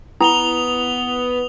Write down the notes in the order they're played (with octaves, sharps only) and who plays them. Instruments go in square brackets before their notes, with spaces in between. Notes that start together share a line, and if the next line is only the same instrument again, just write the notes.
[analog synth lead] B3 [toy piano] E4 [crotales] D#6 F7 G7